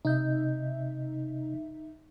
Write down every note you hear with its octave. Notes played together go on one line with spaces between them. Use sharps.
C3 D#4 D#5 E5 G6